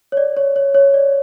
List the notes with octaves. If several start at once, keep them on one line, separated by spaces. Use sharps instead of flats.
C#5
D5
C#5
C#5
C#5
D5